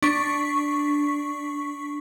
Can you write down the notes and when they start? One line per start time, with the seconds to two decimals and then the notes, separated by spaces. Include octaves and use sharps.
0.02 D4 C#6 B6